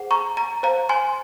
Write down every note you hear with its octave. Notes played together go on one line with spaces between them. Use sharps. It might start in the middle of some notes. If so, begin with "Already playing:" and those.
Already playing: G#4 C5 F#5
A#5 C#6
A#5
C5 F5 A#5
G#5 C6